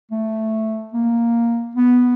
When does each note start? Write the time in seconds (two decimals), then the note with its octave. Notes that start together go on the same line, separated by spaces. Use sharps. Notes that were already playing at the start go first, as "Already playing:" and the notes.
0.11 A3
0.93 A#3
1.75 B3